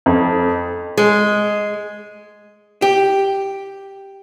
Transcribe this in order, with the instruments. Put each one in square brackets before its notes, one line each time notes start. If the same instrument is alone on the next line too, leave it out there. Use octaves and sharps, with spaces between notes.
[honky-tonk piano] F2
[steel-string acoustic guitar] G#3
[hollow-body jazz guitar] G4